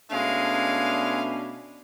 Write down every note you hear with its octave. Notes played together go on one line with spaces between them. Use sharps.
B2 G#3 A3 C#4 D4 F5